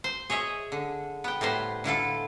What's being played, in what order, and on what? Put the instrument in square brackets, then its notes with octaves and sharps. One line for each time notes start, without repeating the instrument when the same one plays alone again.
[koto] C5
G#4 C#5 D#5 E5
D3
B3 G5
A2 G3 B3 C5
D3 E4 F4 A4